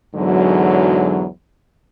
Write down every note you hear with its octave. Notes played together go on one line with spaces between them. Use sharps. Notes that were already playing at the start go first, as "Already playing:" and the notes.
E2 G#2 D3 F#3